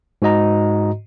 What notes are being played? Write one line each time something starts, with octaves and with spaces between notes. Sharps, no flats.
G#2 F#4 D#5 A#5